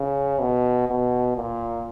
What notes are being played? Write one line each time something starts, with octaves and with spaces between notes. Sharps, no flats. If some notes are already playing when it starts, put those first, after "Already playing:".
Already playing: C#3
B2
B2
A#2